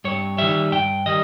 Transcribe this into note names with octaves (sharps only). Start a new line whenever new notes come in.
G2 C#5
D#3 G3 E5
G2 G5
D#3 G3 D#5